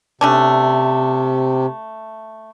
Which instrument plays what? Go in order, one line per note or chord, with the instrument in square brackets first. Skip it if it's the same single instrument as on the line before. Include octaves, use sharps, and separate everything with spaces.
[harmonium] C3 [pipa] A3 C#4 D4